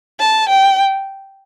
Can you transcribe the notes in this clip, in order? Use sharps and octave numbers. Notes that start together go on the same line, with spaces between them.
A5
G5